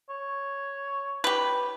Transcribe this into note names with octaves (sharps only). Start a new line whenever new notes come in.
C#5
G4 B4